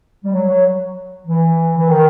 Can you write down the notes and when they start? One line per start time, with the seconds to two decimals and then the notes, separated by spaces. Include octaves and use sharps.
0.24 G3
0.33 F#3
0.48 F#3
1.27 E3
1.77 E3
1.90 D#3